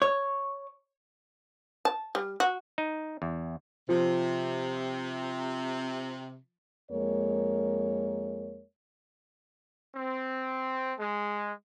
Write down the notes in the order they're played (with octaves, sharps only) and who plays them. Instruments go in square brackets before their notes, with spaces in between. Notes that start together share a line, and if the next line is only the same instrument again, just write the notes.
[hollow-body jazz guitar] C#5
[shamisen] A5
G3
F#4
[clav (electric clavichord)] D#4
E2
[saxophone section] C3 [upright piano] F3
[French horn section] F2 G#3 A#3 A#4 C#5
[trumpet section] C4
G#3